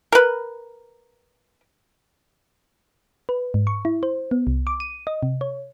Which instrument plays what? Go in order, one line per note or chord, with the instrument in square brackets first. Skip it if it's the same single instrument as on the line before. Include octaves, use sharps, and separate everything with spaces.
[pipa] A#4 B4
[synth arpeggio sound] B4
G#2
C#6
E4
C5
B3
C2
D6
D#7
D#5
C3
C#5